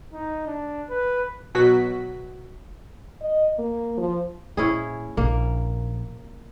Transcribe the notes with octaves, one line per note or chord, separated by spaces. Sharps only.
D#4
D4
B4
B2 F#3 F#4 B6
D#5
A#3
F3
A#2 C#4 E4 G#4
A#1 A#3